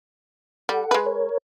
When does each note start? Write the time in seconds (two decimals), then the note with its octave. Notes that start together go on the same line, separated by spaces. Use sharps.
0.69 G3 A4 F#5
0.91 G#3 B4
1.06 A#4 C#5